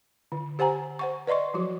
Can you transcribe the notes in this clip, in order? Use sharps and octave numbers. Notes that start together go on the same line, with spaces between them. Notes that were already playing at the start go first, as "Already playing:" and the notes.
D3
G4 C5 F#5 G#5 A#5
C5 F#5 C#6
B4 D5 D#5 C6 C#6
F3 F#3 F#4